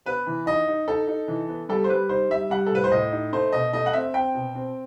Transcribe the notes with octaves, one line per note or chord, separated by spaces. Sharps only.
B3 B4
E3
D#4 D#5
D#4
D#4 A4
D#4
E3
B3
G3 A4
C5
G3 B4
D#4 C5
G3 E5
G3 F#5
A4
A2 B4
C5
A2 D#5
D#4
A3 C5
B2 D#5
A3 D#5
F#5
C4 E5
C4 G5
B2
C4